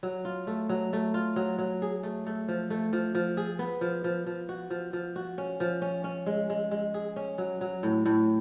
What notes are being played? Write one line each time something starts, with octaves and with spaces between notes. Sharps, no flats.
F#3
F4
A3
F#3
A3
F4
F#3
F#3
G#4
A3
A3
F3
A3
F3
F3
G#4
B3
F3
F3
F3
F#4
F3
F3
F#4
C#4
F3
C#4
C#4
G#3
G#3
G#3
G#4
C#4
F#3
F#3
A2
A2